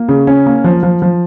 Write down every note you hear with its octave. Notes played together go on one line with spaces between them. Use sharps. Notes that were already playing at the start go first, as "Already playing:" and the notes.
Already playing: A#3
C#3
C#4
A#3
F3
F3
F3